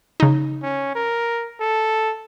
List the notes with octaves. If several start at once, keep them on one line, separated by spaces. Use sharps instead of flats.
C#3 D#4
C#4
A#4
A4